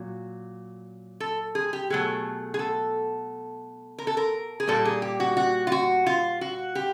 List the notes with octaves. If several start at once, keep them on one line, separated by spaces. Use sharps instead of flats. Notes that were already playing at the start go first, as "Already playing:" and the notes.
Already playing: A#2 F#3
A4
G#4
G4
B2 F#3 A3 G#4
G#4
A4
A#4
A4
A#4
G#4
A#2 G3 A#3 A4
G#4
G4
F#4
F#4
F4
F#4
F4
F#4
G4